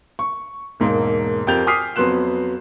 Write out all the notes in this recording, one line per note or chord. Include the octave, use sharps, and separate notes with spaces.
C#6
E1 G#2 A#3
F2 G4 A#4 G6 A6 F7
G#5 D6 D#6 F6 B6 C7
F2 F#3 B3 C6 F#6 E7